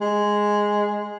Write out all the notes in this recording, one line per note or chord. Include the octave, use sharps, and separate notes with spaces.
G#3